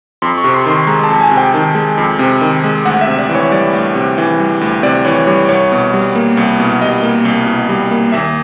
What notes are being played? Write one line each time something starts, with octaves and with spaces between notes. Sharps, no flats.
F2 C6
C#6
C3
C6
D#3 C6
G#3 A#5
A5
F2
G#5
C3
G5
D#3
G#3
F2
C3
D#3
G#3
D2 F#5
E5
C3
D5
E3
C#5
G3 D5
D2
C3
E3
G3
D2
C3 D5
E3 C#5
G3 C#5
C2 C#5
B2
G3
A#3
C2
B2
G3 D#5
A#3
C2
B2
G3
A#3
D#2 E5